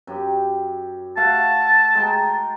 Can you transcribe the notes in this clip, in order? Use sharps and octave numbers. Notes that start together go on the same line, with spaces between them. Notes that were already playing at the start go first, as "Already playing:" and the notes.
F#2 G4
A3 F5 F#5 A5
G#3 G5 A#5